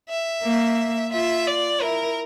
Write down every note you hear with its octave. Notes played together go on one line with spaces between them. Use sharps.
E5
A#3
F4 E5
D5
E4 A#4